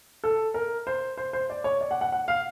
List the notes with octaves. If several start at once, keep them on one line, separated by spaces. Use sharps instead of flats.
A4
A#4
C5
C5
C5
D5
C#5
D5
F#5
F#5
F#5
F5